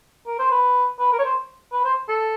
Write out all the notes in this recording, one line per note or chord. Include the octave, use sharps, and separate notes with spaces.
A#4
C5
B4
B4
A#4
C#5
C5
B4
C5
A4